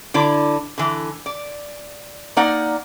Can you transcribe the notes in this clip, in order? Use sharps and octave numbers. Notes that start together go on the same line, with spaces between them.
D3 E4 D5
D3 E3
D5
A#3 D#4 D5 F#5